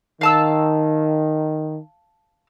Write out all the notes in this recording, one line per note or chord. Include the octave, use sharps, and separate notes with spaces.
D#3 F5 A5 E6